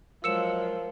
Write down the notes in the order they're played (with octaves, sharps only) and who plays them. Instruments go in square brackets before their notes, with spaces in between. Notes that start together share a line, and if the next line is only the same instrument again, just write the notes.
[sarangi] F3 [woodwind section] F#3 G#3 [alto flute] A#4 [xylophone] E6 C#7 E7